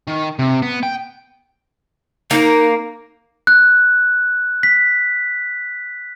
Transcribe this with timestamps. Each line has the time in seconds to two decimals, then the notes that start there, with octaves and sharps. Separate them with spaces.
0.08 D#3
0.39 C3
0.62 B3
0.83 G5
2.31 A#3 D#4
3.47 F#6
4.63 B6